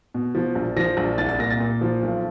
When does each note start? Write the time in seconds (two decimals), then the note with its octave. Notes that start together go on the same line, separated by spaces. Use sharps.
0.14 B2
0.35 F3
0.55 A#1
0.76 F3 A#6
0.97 A#1
1.18 C2 A6
1.29 A6
1.39 A#2 A#6
1.50 A6
1.60 A#2
1.81 F3
2.03 B1